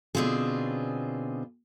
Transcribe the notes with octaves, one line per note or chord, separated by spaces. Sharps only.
B2 D3 C4 C#4 F4 G#4